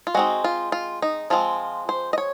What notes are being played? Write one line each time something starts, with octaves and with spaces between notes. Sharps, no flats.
F4
G#3 C4 D#4 F#4
F4
F4
D#4
F3 G#3 C4 F4
C5
D#5
C#5